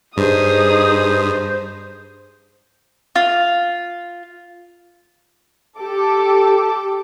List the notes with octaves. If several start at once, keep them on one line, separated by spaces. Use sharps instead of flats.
G2 D#4 G#4 C5 D#6
F4
G4 A4 D6